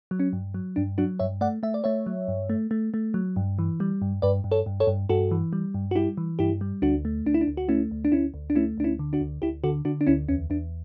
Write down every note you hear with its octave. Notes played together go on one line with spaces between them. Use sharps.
F#3
C#4
G2
F#3
G2 D4
F#3 D4 F#4
G2 C#5 E5
A3 D5 F#5
A3 E5
D5
A3 C#5 E5
F#3
G2
A3
A3
A3
F#3
G2
E3
G3
G2
G2 B4 D5
G2
A4 C#5
G2
A4 C#5
G2
G2 F#4 A4
E3
G3
G2
F#4
G3 E4 G4
E3
G2 E4 G4
G3
D2 D4 F#4
A3
D2 D4
E4
D4
D2
F#4
A3 C#4 E4
D2
D4
D2 C#4 E4
D2
D4
A3 C#4 E4
D2 D4
C#4 E4
D3
D4 F#4
D2
D2 E4 G4
D3 F#4 A4
D3 D4 F#4
D4
D2 C#4 E4
E2 C#4
E2 D4